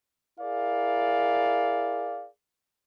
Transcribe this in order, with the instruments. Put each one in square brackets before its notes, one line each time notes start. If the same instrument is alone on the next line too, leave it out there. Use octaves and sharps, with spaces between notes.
[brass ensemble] E4 G#4 A#4 D5 F5